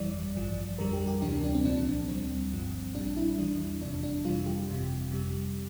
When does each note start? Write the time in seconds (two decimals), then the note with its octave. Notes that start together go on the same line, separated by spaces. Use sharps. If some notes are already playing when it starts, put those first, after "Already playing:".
Already playing: G1 F2 E3 G3 D5
0.36 A1 G2 F3
0.78 F2 D3 G3 A#4
0.93 G4
1.07 G4
1.22 D2 C3 E3 G3 D4
1.44 D4
1.54 C4
1.65 C2 A#2 F3 D4
2.08 D2 D3 G3 C4
2.52 G1 G2 F3
2.95 A#1 A#2 G3 D4
3.17 E4
3.38 E2 E3 G3 D4
3.81 G1 F2 C3 F3 D4
4.03 D4
4.25 F2 C3 E3 G3 F4
4.46 G4
4.69 G1 F2 C3
5.12 F2 C3 G3